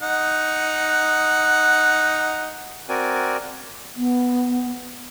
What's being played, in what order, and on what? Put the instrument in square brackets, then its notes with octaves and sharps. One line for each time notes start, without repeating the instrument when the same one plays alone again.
[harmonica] D#4 F#5
[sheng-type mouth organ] C4 F#4 A#4 D5 G#5
[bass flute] B3